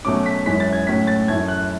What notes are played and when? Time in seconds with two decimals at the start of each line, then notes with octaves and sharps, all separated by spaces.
0.05 B2 F#3 A3 C#4 D6
0.26 B6
0.46 F#2 E3 G#3 C#4 B6
0.60 A6
0.73 G#6
0.87 A2 F#3 C#4 B6
1.07 A6
1.28 F#2 E3 A3 G#6
1.48 F#6